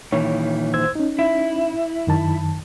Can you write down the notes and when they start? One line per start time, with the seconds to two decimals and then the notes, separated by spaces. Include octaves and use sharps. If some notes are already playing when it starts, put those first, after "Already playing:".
0.12 A#2 D#3 E3 C#5
0.74 C5 E6 G#6
0.95 C#4 D#4
1.19 E4
2.07 F#2 D#3 A5